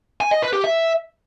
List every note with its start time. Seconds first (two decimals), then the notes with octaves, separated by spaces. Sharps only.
0.21 G#5
0.31 D#5
0.42 B4
0.53 G4
0.64 E5